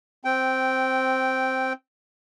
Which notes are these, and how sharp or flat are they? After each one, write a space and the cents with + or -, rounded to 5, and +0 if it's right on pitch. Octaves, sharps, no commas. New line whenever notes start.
C4 +0 G5 -10